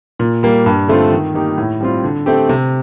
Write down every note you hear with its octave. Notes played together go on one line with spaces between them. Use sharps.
A#2
G3 A#3
G2
D3 A3 C4 F4
D#3
A#3 D#4 G4
A2
G3 C4 F4
D3
A3 C4 G4
C3